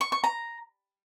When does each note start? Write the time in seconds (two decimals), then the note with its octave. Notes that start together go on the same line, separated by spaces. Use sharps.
0.01 C#6
0.12 C#6
0.24 A#5